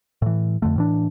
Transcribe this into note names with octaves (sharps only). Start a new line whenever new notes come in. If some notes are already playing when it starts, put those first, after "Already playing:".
A2 E3
F2 D3 A3
A2 E3 D4